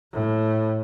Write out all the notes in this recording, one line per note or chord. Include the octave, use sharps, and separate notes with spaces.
A2